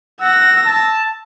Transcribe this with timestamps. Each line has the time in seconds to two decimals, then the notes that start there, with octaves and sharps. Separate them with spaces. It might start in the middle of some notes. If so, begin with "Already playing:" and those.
0.21 F#5 E6 A#6
0.66 A5